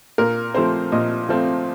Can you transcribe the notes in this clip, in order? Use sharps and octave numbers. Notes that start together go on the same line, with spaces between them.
A#2 A#4
F3 A3 C4 C5
A#2 D#5
F3 A3 C4